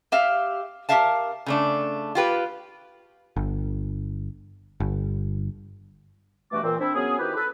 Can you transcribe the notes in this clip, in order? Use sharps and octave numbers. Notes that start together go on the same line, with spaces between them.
G4 E5 F5
G4 G#4 A#4 E5 F5 A5
C#3 A3 D4
F4 G4 B4
G1
G1
G2 B2 E3 A3 F#4 D6
A#2 E3 C4
C4 D4 E4
F#3 A#3 B3 C#4 G#4
D#3 C4 E4 F#4 G4 B4
A4 B4